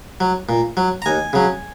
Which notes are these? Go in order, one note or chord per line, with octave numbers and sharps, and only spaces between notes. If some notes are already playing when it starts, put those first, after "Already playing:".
F#3
A#2
F#3
A#5
D#2 G#5
C#3 F#3